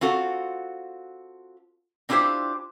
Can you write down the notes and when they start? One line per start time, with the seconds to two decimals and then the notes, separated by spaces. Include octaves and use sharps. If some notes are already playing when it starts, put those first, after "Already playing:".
0.01 C4 F4 F#4 A4
2.09 C4 D4 E4 F4 G4 C5